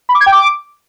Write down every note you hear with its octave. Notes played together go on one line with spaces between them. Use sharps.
B5
D6
G#6
G5
D6